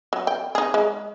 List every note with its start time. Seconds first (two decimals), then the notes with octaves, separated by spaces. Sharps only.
0.13 F#3
0.27 G5
0.55 D#4 G#4
0.74 G#3